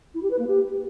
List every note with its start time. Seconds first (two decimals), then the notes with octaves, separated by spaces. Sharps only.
0.14 E4
0.23 G4
0.31 B4
0.39 A#3
0.47 G4